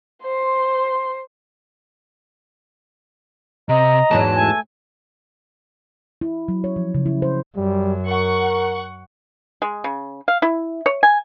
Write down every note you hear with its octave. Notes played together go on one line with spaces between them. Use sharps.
C5 C6
C3 D#5 A#5
E2 G#2 F#3 A5
A3 G#5
E4
F#3
C#5
F3
C#3
E4
C5
F#2 G3
A#4 F#5 C#6
G#3
C#3
F5
E4
C#5
G#5